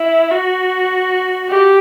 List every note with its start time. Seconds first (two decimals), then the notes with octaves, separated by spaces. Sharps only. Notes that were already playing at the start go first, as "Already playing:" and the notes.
Already playing: E4
0.31 F#4
1.49 G4